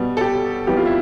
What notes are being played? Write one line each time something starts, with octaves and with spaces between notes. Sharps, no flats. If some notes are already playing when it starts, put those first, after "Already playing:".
Already playing: B2 G3 B3
A4
G4
F2 E3 G3 B3 G4
F4
E4